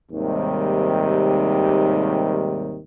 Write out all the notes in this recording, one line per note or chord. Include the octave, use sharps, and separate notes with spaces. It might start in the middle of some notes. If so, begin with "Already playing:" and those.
D#2 G#2 C3 D#3 G3